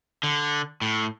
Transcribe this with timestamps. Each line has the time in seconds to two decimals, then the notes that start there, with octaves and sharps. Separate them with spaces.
0.23 D3
0.82 A2